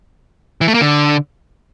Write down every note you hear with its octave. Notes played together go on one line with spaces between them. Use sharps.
E3
A3
A#3
D3